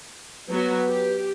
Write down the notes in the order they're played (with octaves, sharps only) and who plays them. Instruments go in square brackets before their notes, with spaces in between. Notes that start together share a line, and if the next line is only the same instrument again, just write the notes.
[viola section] F#3 B3 F#4 [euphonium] B4
[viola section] G4